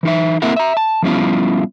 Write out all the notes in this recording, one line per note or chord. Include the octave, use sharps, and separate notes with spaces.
E3 D#4 E5
A#3 C4 E4 A#4 E5 F#5
E5 A#5
A5
F3 G3 B3 C#4 E4 F4